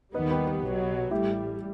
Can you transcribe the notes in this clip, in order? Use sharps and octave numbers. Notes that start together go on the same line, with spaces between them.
D#2 D#3 G3 B3 B4 D#5
G4 B4
G4 B4
B1 B2 F#3
A1 A2 G3 E4 G4